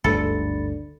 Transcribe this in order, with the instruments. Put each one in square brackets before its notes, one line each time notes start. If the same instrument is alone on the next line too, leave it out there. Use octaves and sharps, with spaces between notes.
[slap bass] G1 D2 G#2 [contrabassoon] D3 [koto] A4 [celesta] B5 A6 C#7